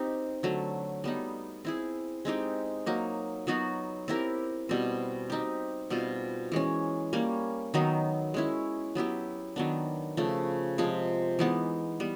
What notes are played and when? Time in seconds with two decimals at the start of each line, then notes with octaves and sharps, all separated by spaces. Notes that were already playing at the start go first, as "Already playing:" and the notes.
Already playing: C4 D#4 G4
0.43 D3 F#3 A3
1.04 G3 B3 D#4
1.65 C4 E4 G#4
2.25 G#3 C4 D#4 G4
2.86 F#3 A#3 D#4
3.47 F#3 B3 D#4 F#4
4.08 C4 E4 G4 A#4
4.69 B2 G3 C4
5.30 C4 D#4 G4
5.90 B2 G3 C4 F4
6.52 E3 G#3 C#4
7.13 G3 A#3 C#4
7.74 D#3 F#3 B3 D#4
8.34 G#3 C#4 E4
8.95 F#3 B3 E4 G4
9.56 D#3 F#3 B3 D4
10.17 C#3 F3 A3
10.78 C3 F3 G#3
11.39 E3 G#3 B3 D#4
12.00 G3 B3